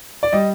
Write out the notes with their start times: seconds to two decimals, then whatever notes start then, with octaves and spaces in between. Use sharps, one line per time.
0.23 D5
0.33 G3 D#5